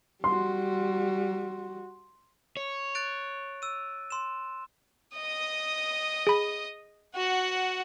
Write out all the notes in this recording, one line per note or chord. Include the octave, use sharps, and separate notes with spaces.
G3 F#4 C6
C#5
F#6 A6 D7
E6 D#7
C6 E7
D#5 D#6
G#4 B5
F#4 F#5